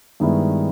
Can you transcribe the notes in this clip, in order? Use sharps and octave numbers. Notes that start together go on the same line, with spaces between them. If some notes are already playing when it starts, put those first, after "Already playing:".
G2 D#3 G#3 B3 E4